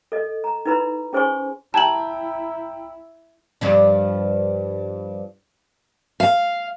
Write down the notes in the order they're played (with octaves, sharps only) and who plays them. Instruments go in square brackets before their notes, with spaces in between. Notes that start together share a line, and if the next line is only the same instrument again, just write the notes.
[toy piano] A4 D#5
A#5
D#4 E4 B4 A#5 B5
C#4 G#4 C5 G#5 C6 C#6
[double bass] E4 [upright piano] G5 A#5 G#6 [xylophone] A5 F#7
[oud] G2 F3 D4
[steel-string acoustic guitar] F5